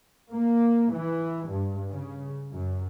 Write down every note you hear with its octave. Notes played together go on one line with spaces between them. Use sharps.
A#3
E3
G2
C#3
F#2